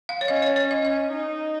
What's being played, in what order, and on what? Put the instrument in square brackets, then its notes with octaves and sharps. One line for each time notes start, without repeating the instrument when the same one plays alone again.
[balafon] F5
C#5
[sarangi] C#4 [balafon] D#5
[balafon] C#5
C#5
D#5
[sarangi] C#4 [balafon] D#5
[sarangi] D#4